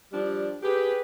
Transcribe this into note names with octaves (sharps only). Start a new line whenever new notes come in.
F3 G3 D4
G4 G#4 B4